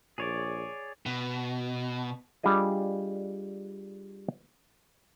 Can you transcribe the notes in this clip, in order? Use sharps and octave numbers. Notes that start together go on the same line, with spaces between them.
A#1 G#4 C#5 D5
B2
G3 D4 F4 G#4 D#5